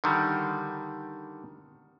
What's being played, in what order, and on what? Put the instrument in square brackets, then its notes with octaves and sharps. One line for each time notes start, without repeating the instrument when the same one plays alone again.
[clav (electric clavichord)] D3 D#3 G3